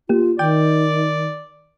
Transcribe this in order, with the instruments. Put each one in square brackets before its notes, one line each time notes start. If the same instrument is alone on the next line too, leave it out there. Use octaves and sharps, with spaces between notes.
[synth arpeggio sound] A#3 G4 [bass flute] F4
[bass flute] D#3 [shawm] D5 [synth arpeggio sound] G5 D6 G6